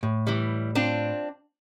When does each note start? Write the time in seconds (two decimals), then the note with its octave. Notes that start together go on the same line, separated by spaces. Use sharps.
0.03 A2
0.27 E3 G3
0.75 C4 D4 F4